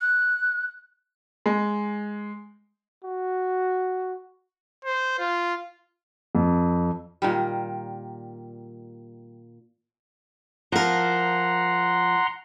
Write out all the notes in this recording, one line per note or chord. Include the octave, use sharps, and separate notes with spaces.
F#6
G#3
F#4
C5
F4
F2
A#2 D#3 G3
F3 A#4 F#5 A#5 C6